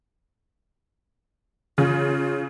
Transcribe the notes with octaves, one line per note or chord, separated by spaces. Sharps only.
C#3 F4